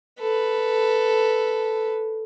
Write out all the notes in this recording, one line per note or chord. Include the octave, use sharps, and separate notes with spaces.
A4 B4